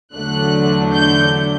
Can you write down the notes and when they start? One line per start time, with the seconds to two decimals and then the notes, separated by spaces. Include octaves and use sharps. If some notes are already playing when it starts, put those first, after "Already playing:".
0.13 E2 D3 F#3 A3 D4 F#6
0.92 G6